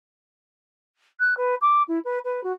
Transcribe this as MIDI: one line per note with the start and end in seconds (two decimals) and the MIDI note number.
1.20 1.34 90
1.37 1.55 71
1.62 1.83 86
1.88 1.99 64
2.05 2.19 71
2.25 2.43 71
2.44 2.52 66